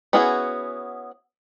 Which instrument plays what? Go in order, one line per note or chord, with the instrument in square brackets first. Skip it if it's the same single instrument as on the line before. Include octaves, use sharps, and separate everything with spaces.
[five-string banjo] B3 C#4 E4 F#4 G#4